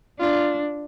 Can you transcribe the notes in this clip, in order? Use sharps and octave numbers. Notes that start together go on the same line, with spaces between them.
D4 F4